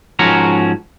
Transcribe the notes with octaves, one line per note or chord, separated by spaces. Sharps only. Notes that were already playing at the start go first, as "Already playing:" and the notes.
G#2 F3 C#4 F#4 A#4 A#5